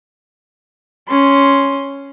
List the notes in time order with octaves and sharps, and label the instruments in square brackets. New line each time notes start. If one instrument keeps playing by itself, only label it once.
[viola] C#4 C6